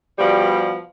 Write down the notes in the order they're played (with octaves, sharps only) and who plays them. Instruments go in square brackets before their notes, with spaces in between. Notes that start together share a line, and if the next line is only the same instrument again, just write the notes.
[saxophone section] B2 F3 G3